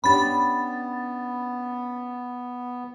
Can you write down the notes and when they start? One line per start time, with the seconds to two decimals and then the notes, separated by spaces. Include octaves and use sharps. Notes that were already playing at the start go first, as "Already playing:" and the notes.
0.04 B3 C#4 D4 G4 B5 A6